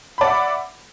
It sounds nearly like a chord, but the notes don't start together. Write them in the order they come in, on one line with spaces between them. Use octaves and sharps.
B5 D5 F#5 E5 D6